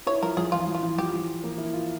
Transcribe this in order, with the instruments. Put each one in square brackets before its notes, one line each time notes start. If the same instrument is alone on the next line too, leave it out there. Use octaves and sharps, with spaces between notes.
[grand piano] E4 [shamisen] C#5
[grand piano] F3 [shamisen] A#4
[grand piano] F3 [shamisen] G#4
[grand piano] E3 [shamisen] F4
[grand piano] F3
[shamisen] F4
[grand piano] E3
[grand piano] F3 [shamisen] G4
[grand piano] E3
A#3
E4
F4